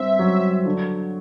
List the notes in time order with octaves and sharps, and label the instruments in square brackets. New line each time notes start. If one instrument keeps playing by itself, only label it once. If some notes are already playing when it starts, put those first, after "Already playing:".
Already playing: [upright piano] G2 C4 [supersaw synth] E5
[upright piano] F#3
D3